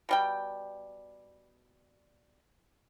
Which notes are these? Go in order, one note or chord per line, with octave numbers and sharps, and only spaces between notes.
B2 G3 G5